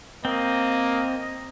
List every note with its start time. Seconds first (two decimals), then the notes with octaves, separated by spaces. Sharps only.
0.25 A#3 C4 D#5